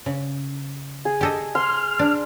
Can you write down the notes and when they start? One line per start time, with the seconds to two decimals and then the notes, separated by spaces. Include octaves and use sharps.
0.06 C#3
1.05 G#4
1.21 G4 A4 D#5
1.55 C6 F6
1.99 D4